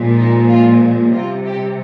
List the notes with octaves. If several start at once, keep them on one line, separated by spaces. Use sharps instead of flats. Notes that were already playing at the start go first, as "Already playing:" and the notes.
Already playing: A#2 F3 G#3
D#4
F4
C3 G3 F4
G4